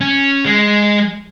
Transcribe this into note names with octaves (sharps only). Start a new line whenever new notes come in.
C#4
G#3